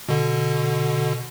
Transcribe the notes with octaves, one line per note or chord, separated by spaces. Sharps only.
B2 D3